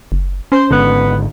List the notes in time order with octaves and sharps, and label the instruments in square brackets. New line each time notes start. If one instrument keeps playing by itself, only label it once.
[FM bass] F#1
[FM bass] C#4 [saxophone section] C5
[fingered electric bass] G#1 G#2 D3 [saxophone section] B3